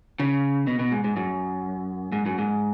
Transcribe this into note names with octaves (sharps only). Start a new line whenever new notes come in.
C#3
B2
B2
G#2
G#2
F#2
G#2
F#2
G#2